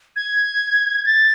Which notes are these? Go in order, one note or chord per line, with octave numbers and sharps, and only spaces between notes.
G#6
A6